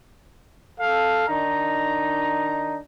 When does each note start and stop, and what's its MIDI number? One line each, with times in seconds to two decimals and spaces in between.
0.80 1.27 69
0.80 1.27 77
1.28 2.78 51
1.28 2.78 62
1.28 2.78 63
1.28 2.78 82